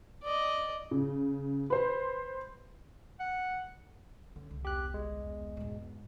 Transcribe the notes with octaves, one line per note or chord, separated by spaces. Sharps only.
D5 D#5
C#3
B4 C5
F#5
D3 C#4
C2
E2 G4 F#6
G1 G#3
E2
G#2 B2